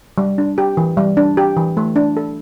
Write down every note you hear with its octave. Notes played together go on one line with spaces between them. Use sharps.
G3
D4
G4
E3
G3
D4
G4
E3
A3
D4
A4